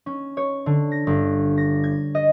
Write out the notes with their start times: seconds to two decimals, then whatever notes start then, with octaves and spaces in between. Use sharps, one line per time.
0.06 C#4
0.37 C#5
0.66 D3
0.92 A#6
1.07 G1
1.57 A#6
1.84 G#6
2.15 D#5